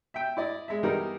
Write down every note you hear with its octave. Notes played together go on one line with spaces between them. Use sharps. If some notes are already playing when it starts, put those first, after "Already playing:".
E5 G5
E4 D5 D#5
G#3 E5
E3 G3 B3 D#4 A#4